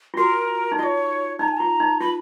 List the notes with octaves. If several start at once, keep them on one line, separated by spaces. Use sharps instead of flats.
F4
F#4 A#4
D#4
F4 C#5 D#5
D#4 A#5
G#5
F4 A#5
D#4
F4 B5